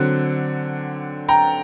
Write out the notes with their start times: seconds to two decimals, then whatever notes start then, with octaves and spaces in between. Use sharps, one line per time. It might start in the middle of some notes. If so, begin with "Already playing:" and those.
Already playing: D3 F#3 C4 F#6
1.28 G5 A#5